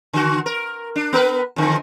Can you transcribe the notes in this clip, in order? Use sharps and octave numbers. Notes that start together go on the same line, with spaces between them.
D3 F#4
A#4
D4
B3 A#4 B4
F2 D3